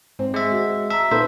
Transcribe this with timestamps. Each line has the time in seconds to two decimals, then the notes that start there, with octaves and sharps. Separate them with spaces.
0.19 G#2 C4
0.34 G#3 E5
0.52 F#4
0.91 E5 A5 A#5
1.11 A#2 D#4 A4 B4 C5 E5